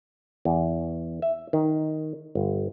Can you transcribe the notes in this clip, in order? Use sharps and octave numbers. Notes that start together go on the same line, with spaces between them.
E2
E5
D#3
G1